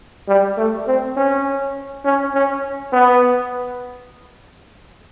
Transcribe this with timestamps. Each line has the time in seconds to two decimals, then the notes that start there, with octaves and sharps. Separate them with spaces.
0.28 G3
0.58 A3
0.87 C4
1.17 C#4
2.05 C#4
2.34 C#4
2.93 B3